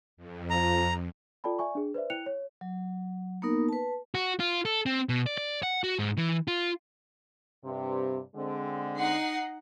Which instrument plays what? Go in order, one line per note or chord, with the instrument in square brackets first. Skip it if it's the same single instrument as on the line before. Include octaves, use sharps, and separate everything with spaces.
[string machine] F2
[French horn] F3 [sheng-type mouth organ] A#5
[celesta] F4 A4 D5 G5 A5 B5
D5 E5 G#5 C#6
D4 G#4
B4 C5 D5 E5
E4 G5 F#6 C#7 F7
C#5
[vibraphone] F#3
A#3 B3 D#4 A#4
B4 A5
[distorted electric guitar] F#4
F4
A4
C4
B2
D5
D5
F#5
F#4
G#2
E3
F4
[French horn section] G2 C3
D3 G#3 C4
[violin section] D#4 F#5 C7